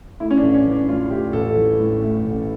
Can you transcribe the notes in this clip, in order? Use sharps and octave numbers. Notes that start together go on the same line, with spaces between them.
A3 E4
C#4
D4
A1
C#4
E3
D4
A2 F4
F4
A3 G4
A1 A4
E3
A2
A3
A1